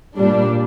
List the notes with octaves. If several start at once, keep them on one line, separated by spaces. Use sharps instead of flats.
A#2 G3 D4